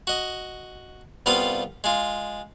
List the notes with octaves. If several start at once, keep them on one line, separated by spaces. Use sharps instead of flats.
F#4 D#5
C2 G3 B3 F4 F5 D#6
G#3 F4